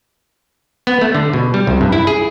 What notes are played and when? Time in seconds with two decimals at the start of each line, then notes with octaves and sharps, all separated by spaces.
0.87 B3
1.01 A3
1.15 D3
1.33 B2
1.54 G3
1.67 C2
1.81 G2
1.92 E4
2.07 G#4